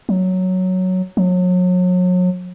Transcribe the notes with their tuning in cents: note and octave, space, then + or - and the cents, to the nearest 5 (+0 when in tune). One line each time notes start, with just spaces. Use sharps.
F#3 +0
F#3 -35